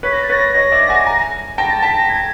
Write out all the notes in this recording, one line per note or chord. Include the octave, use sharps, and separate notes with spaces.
B4 C#5 B6
A#6
A6
B4 C#5 A#6
C#5 D#5
D5 E5
F#5 G#5
G#5 A#5
G5 A5 A#6
A6
G5 A5 B6
A#6
G#6